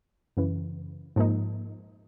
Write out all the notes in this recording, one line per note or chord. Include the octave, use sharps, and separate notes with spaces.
F#2 C#3 E3
G#2 F3 A#3 D#4